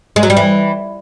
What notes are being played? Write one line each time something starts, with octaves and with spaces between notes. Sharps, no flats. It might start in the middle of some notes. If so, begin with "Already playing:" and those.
G#3
F#3
G3
E3